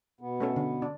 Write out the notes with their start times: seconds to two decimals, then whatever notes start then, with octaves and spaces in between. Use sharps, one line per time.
0.21 B2 B3
0.40 A3 C#4 A4
0.56 D3
0.82 D4